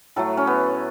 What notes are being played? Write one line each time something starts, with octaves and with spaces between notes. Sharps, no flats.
A2 F#3 A3 A4
C#4
B3